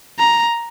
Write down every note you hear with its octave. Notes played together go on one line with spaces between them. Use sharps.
A#5